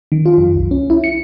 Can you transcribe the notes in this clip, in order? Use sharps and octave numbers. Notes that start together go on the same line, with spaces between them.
D#3
F4
F#2
C2
C#4
E4
C#7